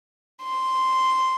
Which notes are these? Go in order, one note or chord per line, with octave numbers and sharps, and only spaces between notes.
C6